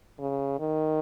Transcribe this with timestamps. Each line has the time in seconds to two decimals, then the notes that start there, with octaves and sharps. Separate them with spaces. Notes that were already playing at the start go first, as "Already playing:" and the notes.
0.19 C#3
0.60 D#3